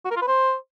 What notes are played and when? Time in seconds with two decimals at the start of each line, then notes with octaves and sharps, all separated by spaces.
0.05 F#4
0.11 A#4
0.16 F4
0.22 B4
0.28 C5